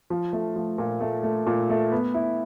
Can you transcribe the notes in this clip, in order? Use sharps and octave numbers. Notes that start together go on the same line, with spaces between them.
F3
A3
F3
A#2
A3
A3
A#2
A3
B3
E4